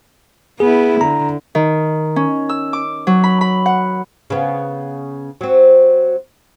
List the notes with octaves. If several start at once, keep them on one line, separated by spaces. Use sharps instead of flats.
B3 E4 G#4
D3 A#5
D#3
C#4
E6
D6
F#3
B5
B5
F#5
C#3 B3
F#3 C4